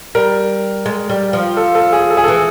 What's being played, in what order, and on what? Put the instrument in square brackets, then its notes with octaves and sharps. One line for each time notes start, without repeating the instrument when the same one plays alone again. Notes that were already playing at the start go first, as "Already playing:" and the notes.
[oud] G3 [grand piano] A#4
[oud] G#3
G3
F3
[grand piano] A4
A4
G#4
A4
G#4
[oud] E3 [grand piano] A4